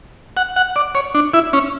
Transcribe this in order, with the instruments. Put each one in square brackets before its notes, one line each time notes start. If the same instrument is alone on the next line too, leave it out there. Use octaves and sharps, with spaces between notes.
[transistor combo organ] F#5
F#5
D5
C#5
D4
E4
C#4